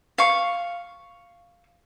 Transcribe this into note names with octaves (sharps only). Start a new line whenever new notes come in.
F5 C#6